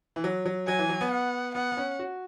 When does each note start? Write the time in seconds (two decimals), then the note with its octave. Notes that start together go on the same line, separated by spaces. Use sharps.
0.16 E3
0.24 F#3
0.46 F#3
0.67 F#3 G#5
0.79 E3
0.89 F#3
1.01 B3
1.11 F#5
1.55 B3 F#5
1.72 B3
1.77 C#4
1.99 F#4